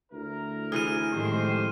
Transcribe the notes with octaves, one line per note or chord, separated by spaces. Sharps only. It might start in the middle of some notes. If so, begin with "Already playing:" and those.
D2 E4 A#4
E3 G#4 F6 D#7
F2 A2 D#3 G#3 G4 C5